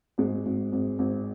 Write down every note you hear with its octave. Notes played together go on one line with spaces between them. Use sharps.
G#1 G#3
G#1
G#1
G#1